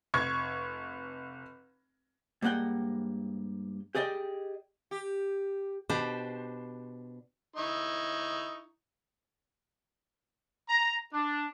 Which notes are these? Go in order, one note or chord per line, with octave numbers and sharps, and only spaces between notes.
F1 C#6 G#6
G2 G#3 A#3 F#5 G5
G4 G#4 D5 D#5 G5
G4
B2 D4 G4 B4 C5
D#4 E4 C#6
A#5
D4